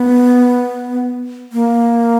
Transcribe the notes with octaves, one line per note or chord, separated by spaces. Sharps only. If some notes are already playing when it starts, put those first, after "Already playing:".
Already playing: B3
A#3